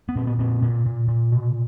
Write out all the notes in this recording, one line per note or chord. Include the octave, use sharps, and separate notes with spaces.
B3
A#2 C4
B3
A#2 C4
A#2
A#2
A#2
B2